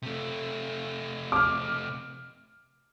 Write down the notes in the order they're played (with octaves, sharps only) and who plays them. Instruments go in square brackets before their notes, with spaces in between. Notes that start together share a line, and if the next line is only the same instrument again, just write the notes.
[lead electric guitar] C3 A3
[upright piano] D6 F6